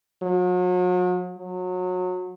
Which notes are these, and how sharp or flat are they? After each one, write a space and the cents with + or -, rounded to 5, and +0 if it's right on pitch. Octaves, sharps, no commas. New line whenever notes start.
F#3 -40
F#3 -25